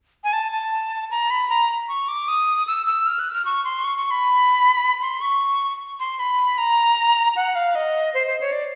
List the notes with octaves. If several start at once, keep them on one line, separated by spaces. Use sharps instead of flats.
G#5
A5
A5
A#5
B5
A#5
C#6
D6
D#6
E6
E6
F6
F#6
F6
C#6
C6
C#6
C#6
B5
C6
C#6
C6
B5
A#5
F#5
F5
D#5
C5
C5
C#5
D5